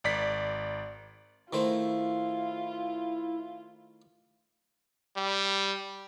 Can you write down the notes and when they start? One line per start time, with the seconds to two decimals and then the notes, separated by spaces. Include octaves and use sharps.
0.04 G#1 D5 B6
1.53 D#3 A3 E4 F4 C5
5.17 G3